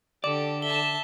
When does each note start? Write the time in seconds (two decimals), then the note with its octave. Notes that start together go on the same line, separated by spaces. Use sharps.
0.24 D3 G4 A4 D5 D6
0.62 E5 A5 G7